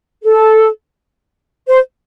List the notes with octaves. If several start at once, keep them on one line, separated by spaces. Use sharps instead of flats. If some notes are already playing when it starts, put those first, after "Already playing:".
A4
C5